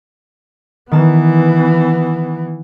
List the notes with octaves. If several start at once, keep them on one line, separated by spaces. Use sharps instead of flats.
D#3 E3 B3 A5